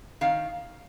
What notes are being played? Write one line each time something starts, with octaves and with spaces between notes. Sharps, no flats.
D#3 F5